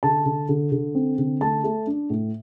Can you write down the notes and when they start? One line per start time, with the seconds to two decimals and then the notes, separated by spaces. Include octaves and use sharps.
0.03 D3 A5
0.25 D3
0.49 D3
0.72 D3
0.95 C4
1.18 D3
1.41 A3 A5
1.64 A3
1.87 D4
2.10 A2